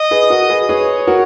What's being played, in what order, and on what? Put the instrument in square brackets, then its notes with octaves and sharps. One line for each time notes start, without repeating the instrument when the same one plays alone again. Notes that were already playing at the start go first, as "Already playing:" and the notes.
Already playing: [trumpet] D#5
[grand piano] G#4 B4
F#4 A#4
G#4 B4
[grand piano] G#4 B4 [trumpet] C#5
[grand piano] F#4 A#4